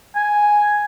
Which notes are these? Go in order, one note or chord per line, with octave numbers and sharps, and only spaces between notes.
G#5